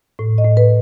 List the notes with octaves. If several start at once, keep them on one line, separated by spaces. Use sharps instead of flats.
A2
D#5
A2
B4